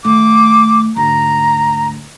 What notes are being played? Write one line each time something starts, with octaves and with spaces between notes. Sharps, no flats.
D#3 A3 D6
D2 G#2 A#5